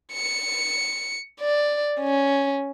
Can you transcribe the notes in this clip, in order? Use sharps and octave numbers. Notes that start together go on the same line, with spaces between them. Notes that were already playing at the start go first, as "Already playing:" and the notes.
C#7
D5
C#4